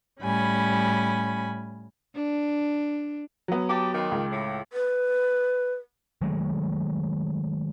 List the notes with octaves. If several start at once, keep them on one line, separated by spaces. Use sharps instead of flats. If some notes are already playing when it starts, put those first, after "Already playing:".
A2 G3 C#4 G#5 B5
D4
F#3 B3
G4 A5 D6
D#3 G5 C6
C#2
A2
B4
D#3 F#3 G#3 A3